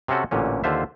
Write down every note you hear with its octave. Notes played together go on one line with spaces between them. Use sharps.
C3 C4 C#4 F#4 A4
A1 A#2 D3 C#4
D#2 D3 F4 C5 E5